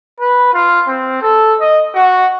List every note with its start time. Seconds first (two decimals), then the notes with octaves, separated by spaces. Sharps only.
0.20 B4
0.54 F4
0.88 C4
1.22 A4
1.60 D#5
1.95 F#4